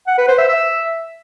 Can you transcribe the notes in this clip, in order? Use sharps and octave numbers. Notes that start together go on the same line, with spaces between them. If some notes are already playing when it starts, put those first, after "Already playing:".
F#5
B4
C5
E5
E5